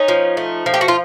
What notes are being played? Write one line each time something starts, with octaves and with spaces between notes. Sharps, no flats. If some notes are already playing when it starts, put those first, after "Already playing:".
Already playing: C#4 D#4
F3
A3
F3
G4
F#4
F4